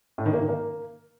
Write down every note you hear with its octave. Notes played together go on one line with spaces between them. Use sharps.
A2
D#3
A#3
D#3
A#3